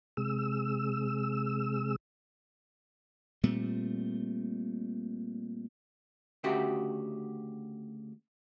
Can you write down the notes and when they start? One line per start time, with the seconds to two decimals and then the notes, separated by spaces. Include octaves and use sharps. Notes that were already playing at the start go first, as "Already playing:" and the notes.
0.17 C3 G#3 E6
3.43 A#2 G3 A3 C4
6.44 D2 C#3 F#4 G4 E5